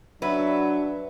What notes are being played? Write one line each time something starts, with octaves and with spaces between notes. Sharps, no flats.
F#3 D4 B4 E5